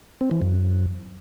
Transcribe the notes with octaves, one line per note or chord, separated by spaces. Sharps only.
C4
E3
F#2